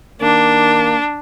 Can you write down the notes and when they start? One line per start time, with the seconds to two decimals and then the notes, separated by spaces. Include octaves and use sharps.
0.20 D#3 A#3 D4